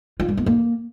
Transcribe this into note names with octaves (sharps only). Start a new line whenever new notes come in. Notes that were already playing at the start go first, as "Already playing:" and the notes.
F4
G3
B3
A#3